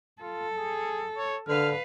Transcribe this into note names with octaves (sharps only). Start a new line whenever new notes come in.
F4 A4
G#4
C#5
D3 B4 F5 F6